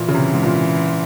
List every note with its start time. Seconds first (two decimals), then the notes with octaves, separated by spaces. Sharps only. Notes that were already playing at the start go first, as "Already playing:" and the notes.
Already playing: A#2 E3
0.08 C#3
0.14 C3
0.33 G#2
0.43 A#2